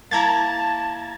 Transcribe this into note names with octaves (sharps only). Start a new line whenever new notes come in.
A#3 E4 A5 A#5 G#6 A6